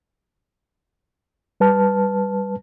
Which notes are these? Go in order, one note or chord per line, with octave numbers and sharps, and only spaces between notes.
G3 B4 A5 F6